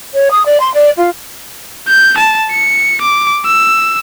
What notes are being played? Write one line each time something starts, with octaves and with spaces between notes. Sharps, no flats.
C#5
D#6
D5
C6
D5
F4
G6
A5
C#7
D6
E6